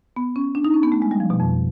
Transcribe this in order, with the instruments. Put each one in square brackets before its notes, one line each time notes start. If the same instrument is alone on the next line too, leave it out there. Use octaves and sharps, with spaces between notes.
[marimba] B3
C#4
D4
D#4
C#4
B3
A3
G#3
G3
F3
B2
F2